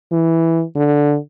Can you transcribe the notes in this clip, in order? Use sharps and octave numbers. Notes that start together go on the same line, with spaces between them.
E3
D3